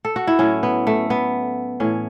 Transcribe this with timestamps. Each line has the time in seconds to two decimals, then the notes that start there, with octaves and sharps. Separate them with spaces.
0.05 A4
0.16 F#4
0.27 E4
0.39 A2 F#3 C#4
0.63 B3
0.87 A3
1.10 B3
1.80 A2 E3 C#4